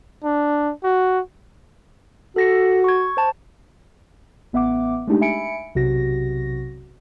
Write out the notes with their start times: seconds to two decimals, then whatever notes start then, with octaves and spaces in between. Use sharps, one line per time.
0.24 D4
0.84 F#4
2.36 F#4 A4 A#6 C#7
2.84 C#6 G#6
3.17 C5 A5
4.53 A1 B3 E5 F#5 D6
5.07 G#3 A3 D4 D#4 G4
5.21 E5 G#5 B5 C#7 D7
5.75 B1 C3 F#4 A#6